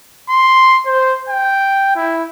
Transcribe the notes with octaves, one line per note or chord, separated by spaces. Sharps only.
C6
C5
G5
E4